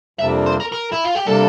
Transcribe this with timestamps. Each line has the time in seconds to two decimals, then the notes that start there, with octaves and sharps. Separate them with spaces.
0.19 F2 C3 G3 A#3 D4 E5
0.46 C5
0.60 A#4
0.72 A#4
0.92 E4
1.04 F4
1.15 G4
1.26 C3 G3 A#3 D4 A4